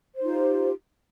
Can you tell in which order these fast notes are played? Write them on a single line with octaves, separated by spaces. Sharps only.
C5 D#4 F4 G4